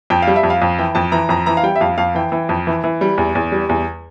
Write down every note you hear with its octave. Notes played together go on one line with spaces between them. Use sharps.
F2 G5
G3 F5
E5
F2
F5
F2
E3 G5
F2 A5
E3 A#5
F2 A#5
E3 A#5
F5
G3 G5
E5
F2 F5
F2 F5
E3 G5
E3
F2
E3
E3
G3
E2
E2
G3
E2